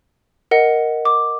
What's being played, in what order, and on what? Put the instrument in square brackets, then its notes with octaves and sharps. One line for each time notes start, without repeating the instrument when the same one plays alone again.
[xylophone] A#4 D#5 F#5
D6